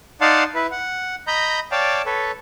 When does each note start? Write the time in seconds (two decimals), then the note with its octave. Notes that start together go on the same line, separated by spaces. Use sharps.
0.21 D#4 D5 F5 F#5 A5 C6
0.55 E4 B4
0.71 F#5
1.27 D#5 A#5 B5 G6
1.72 C#5 D5 F5 G5 A5
2.06 A4 B4 C#5